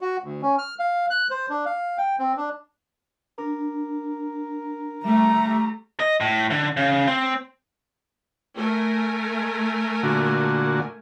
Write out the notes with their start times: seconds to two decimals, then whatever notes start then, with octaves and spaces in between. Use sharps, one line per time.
0.01 F#4
0.23 D2
0.42 C#4
0.59 F6
0.79 F5
1.10 F#6
1.30 C5
1.50 D4
1.66 F5
1.98 G5
2.19 C4
2.37 D4
3.38 D4 A#4
5.04 G3 A3 E5 A#5
6.00 D#5
6.20 A2
6.50 D3
6.77 C#3
7.07 C4
8.57 A3 A#4 G#5
10.03 A#2 D3 F#4